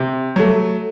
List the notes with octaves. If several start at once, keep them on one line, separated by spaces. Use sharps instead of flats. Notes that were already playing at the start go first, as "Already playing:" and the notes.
Already playing: C3
F#3 A3